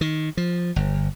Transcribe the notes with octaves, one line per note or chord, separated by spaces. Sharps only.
D#3
F3
G1